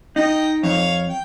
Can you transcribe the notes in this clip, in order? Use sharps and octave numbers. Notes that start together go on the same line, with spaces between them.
D#4 D#5 G5
F2 C#5 F5
G5